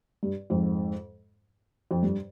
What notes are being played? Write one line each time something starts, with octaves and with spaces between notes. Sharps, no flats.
G2
F2 G#2
F2
G2